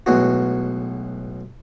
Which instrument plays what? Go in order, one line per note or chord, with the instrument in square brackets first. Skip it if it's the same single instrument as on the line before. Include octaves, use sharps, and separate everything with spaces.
[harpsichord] B1 A2 G#3 B3 F#4